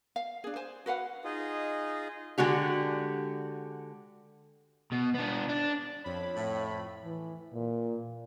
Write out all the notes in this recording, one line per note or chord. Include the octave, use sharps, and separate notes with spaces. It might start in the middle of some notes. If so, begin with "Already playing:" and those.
F5
D4 G#4
C5 G#5
F#4 B4 F5 F#5
D#4 F4 G#4 D#5
D3 G#3 F#4 G4
B2
B3 D4
D4
F2 C#5 B5
A2
E3
A#2